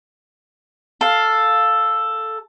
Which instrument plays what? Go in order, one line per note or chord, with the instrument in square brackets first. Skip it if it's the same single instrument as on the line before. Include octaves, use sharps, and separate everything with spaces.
[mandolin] A4 F5